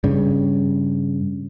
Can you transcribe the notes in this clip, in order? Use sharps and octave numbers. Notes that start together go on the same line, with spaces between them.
G2 C#3